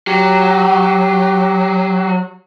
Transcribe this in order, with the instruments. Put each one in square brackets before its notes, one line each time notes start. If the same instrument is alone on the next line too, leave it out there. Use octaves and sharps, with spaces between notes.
[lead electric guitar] F#3 [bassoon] G4